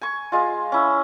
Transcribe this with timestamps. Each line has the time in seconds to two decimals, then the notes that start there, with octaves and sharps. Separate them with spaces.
0.02 G#5 C#6
0.32 G#3 F4
0.72 C#4 E4